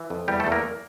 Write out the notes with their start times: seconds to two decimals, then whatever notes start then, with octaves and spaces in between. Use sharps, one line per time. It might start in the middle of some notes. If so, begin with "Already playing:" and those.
Already playing: E3
0.10 F2
0.28 E2 G3 G4
0.40 A3 A4
0.47 E2
0.52 A#3 A#4